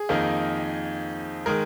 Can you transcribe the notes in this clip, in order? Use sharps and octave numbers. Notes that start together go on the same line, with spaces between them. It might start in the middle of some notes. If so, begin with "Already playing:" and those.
Already playing: G#4
F2 D#3 A#3 D#4
D#3 G#3 A#4